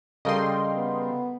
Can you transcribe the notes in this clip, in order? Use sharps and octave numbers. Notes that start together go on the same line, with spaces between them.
C#3 G3 A4 A#4 D#5 F5 G5 C6
B3